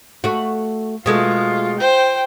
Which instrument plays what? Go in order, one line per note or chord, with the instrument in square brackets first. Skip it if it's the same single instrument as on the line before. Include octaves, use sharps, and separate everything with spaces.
[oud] A3 F#4
[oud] B2 G#3 A3 [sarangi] F4
[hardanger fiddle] C5 [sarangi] G5